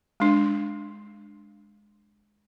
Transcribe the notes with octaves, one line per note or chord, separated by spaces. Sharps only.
G#3 D4